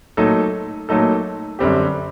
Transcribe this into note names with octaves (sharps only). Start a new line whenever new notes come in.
A#2 F#3 A3 D#4 A4
A#2 F#3 A3 D#4 A4
F#2 D3 G3 C4 G4